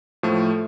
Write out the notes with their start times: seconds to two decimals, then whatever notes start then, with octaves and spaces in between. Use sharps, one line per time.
0.23 A2 F3 A3